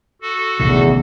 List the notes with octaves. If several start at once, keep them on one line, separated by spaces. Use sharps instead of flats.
F#4 A4
A1 E2 C3 D#3